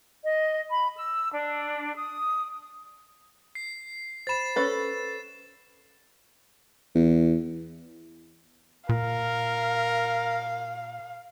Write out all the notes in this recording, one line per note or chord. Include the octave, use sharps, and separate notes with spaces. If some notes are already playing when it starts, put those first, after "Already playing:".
D#5
B5
E6
D4
D#6
C7
C5 B5 A6 C7 E7
C#4 A4 B4
E2
A#2 A#4 F5